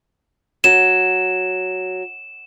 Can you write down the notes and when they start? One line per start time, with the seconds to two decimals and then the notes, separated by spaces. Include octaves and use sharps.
0.64 F#3 E7